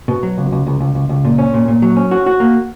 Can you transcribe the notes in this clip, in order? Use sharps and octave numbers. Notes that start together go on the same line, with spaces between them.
B2
F#3
C#2
C#2
C#2
C#2
C#2
C#2
A#2
C#4
A#2
A#2
F#3
C#4
F#4
F#4
A#3